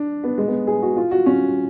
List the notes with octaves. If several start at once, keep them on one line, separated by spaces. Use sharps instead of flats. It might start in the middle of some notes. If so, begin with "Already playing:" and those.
Already playing: D4
B3
G#3
B3
G#4
F#4
F4
F#4
C#4